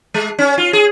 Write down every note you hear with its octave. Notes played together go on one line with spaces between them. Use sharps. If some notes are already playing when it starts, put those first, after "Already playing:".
G#3
C#4
F4
G#4